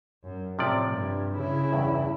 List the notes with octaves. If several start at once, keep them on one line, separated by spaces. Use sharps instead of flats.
F#2
A2 C3 F3 D5
G2
C#3 E4
E2 G2